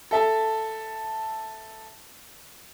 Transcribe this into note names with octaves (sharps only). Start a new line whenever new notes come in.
A4 E5 A5